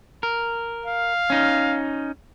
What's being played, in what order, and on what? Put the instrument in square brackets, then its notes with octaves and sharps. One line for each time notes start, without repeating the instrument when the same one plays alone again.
[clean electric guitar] A#4
[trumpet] F5
[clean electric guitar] C#4 D#4